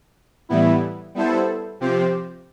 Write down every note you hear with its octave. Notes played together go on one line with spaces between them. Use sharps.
A2 E3 G3 B3 E4
G3 B3 E4 A4 C5
C3 F3 C4 G4 C5